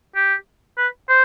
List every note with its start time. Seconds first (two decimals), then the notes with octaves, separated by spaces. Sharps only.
0.15 G4
0.78 B4
1.09 C5